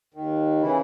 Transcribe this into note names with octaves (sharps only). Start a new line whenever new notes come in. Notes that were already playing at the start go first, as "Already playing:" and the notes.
D#2 D#3
C#3 E3 E4